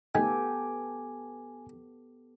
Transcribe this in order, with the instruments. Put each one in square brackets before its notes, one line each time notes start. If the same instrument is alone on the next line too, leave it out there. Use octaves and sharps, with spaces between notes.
[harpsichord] D#3 A3 [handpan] B3 G4 A4 [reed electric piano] G#5